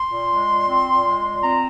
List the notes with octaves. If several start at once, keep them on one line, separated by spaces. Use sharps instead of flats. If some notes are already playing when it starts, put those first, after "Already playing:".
Already playing: C6
A#2
G#3
A#2
C4
A#2
G#3
A#2
C4 A#5